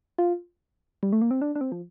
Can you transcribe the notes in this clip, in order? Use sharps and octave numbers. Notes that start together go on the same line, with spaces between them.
F4
G3
A3
A#3
C4
D4
D4
C4
F3